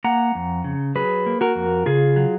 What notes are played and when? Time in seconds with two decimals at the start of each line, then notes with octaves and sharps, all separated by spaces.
0.04 A#3 F#5 A#5
0.35 F2
0.64 C#3
0.95 F#3 G#4 B4
1.26 A#3
1.41 F#4 A#4
1.55 F2
1.86 C#3 F4 G#4
2.16 F#3